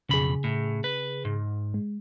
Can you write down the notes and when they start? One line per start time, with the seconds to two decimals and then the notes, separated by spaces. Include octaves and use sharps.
0.09 B1 F2 C#3 G#4 B5
0.44 A2
0.84 B4
1.25 G#2
1.74 G#3